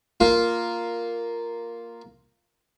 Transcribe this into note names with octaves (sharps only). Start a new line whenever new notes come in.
A#3 F4